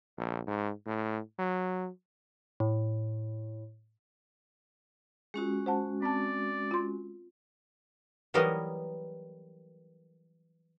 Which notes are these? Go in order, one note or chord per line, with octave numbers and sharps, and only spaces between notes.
A#1
G#2
A2
F#3
A2
G#3 C#4 F4 F#4 G#4
C5 F#5 A5
C4 D5 A5
F4 C6
E3 F#3 G3 B3 A#4 D#5